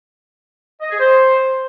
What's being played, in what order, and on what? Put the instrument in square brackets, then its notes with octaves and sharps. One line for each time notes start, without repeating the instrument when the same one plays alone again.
[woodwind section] D#5
G#4
C5